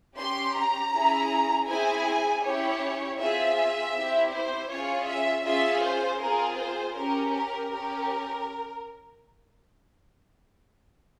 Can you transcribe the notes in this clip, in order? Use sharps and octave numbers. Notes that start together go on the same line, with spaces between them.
C#4 G4 C6
A#5
C#4 E4 G#4
C4 E4 G#4 G#5
C#4 E4 G4 C#5
C4 F4 G#4 E5
C4 E4 G4
C5
C#4 F4 G#4 C#5
E5
C#4 F4 G#4 E5
C5
C4 F4 G#4 A#4
C5
C#4 G4 A#4
A#4
C#4 G4 A#4